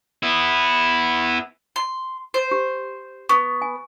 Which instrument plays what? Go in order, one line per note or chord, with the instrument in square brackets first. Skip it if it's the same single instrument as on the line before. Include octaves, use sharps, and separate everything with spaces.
[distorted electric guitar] B3 E4
[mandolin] C6
C5
[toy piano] G4
[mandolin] B3 [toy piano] C#6
[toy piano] G#5